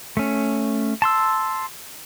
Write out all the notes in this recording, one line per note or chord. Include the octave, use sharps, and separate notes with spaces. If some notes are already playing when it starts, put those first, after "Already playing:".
A3 C#4
A5 C6 E6